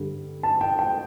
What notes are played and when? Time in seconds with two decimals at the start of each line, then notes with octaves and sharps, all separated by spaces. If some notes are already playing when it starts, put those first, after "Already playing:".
Already playing: G2 D3 G3
0.43 A5
0.61 G5
0.79 G5